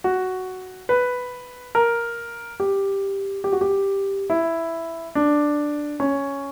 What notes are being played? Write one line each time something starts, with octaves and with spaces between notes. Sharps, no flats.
F#4
B4
A#4
G4
G4
F#4
G4
E4
D4
C#4